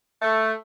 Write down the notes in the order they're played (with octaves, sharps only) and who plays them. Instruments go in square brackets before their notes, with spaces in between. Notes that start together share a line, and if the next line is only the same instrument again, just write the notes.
[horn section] A3